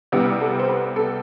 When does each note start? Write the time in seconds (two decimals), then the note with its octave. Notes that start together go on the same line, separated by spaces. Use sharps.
0.12 C2 C3 G3 B3 G4
0.40 A4
0.59 C5
0.69 B4
0.96 A4